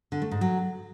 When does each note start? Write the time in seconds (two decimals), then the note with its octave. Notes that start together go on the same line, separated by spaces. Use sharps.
0.12 D3
0.22 A3
0.31 G#2
0.41 F#3